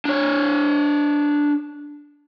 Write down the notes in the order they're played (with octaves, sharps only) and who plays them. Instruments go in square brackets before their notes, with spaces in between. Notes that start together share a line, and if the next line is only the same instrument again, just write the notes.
[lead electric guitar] D4 C#5